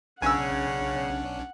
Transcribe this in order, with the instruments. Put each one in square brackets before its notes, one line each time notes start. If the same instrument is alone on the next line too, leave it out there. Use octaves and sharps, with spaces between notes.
[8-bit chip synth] B1 C#4 D4 [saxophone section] C#3 [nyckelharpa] F#5 [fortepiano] G#5 E6